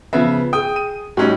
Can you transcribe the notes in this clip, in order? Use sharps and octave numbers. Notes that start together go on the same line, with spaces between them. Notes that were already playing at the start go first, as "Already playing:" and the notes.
C#3 F3 B3 E5
G#4 G5 D#6
D#7
A2 G3 C#4 D#4 F#4 C#5